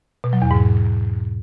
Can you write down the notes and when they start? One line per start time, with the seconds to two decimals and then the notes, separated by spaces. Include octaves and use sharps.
0.24 B2
0.33 F#3
0.42 E2
0.51 G#2